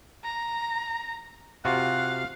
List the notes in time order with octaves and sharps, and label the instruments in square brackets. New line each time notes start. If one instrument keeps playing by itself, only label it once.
[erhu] A#5
[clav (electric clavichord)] C3 F4 F#4 [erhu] F5 [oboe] F#5